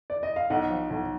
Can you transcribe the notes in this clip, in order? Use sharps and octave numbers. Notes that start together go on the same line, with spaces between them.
D5
D#5
F5
B1 D#5 F#5
F3
B1